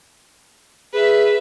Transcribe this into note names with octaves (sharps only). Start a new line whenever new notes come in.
G#4 B4 E5